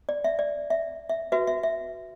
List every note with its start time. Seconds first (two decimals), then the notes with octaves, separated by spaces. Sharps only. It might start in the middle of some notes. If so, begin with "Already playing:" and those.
0.09 D5
0.24 E5
0.39 D5
0.70 E5
1.09 E5
1.32 F#4 B4 E5
1.47 E5
1.63 E5